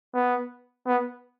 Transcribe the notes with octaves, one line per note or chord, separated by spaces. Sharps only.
B3
B3